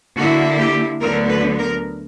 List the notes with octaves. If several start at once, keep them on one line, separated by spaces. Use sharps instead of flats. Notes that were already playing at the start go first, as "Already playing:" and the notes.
D3 A#3 E4 F#4
G4
D2 D3 F#3 B3 A#4
B4
A#4